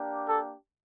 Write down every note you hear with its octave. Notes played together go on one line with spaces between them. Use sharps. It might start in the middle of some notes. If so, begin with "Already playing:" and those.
Already playing: A#3 D4 G4
A4